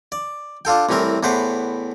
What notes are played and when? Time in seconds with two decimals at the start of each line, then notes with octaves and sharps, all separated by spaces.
0.12 D5
0.65 D4 F4 A4 G5
0.89 C2 A2 E3 C4 A#4
1.23 E2 A2 B4 C5 F#5 D6